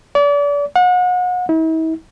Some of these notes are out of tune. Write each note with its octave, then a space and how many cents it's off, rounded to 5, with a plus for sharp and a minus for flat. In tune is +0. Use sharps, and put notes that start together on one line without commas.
D5 -35
F#5 -35
E4 -45